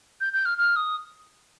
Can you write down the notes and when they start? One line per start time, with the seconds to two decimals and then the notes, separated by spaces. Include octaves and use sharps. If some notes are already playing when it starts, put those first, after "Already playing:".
0.21 G6
0.33 G6
0.45 F6
0.58 F6
0.76 D#6